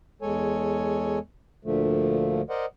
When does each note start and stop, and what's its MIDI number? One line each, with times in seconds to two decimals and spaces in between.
0.22 1.19 40
0.22 1.19 56
0.22 1.19 69
0.22 1.19 73
0.22 1.19 80
1.65 2.41 38
1.65 2.41 46
1.65 2.41 50
1.65 2.41 53
1.65 2.41 57
2.50 2.65 70
2.50 2.65 72
2.50 2.65 74
2.50 2.65 75
2.50 2.65 78